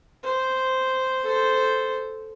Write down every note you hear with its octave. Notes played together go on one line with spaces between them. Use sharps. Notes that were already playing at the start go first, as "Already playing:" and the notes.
C5
A4 C5